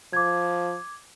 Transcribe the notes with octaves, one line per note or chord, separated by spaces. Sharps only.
F3 D6 G#6